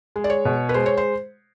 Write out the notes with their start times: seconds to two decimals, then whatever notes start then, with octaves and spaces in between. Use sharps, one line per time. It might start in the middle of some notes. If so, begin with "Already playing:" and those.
0.16 G#3
0.24 D5
0.30 C#5
0.45 B2
0.69 B4
0.74 G#3 C5
0.86 C#5
0.97 C5